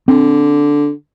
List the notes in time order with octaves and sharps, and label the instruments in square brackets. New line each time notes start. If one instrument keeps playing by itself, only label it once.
[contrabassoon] D3 [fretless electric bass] C4